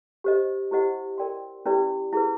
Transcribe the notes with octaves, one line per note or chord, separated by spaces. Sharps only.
G4 C5 D#5
E4 G4 C5 D#5 F#5
A#4 D5 G5 C6
C#4 E4 G4 B4 D5
E4 G#4 B4